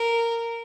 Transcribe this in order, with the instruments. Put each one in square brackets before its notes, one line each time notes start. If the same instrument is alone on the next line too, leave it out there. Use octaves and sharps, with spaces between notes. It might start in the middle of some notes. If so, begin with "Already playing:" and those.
Already playing: [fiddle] A#4